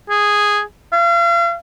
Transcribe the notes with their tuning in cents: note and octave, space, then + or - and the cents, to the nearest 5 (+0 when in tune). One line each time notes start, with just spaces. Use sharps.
G#4 -5
F5 -40